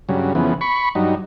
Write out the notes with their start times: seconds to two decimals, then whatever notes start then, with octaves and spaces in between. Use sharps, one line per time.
0.09 G2 C#3 F#3
0.35 F2 C#3 E3 B3
0.61 B5 C#6
0.95 G2 F#3 D#4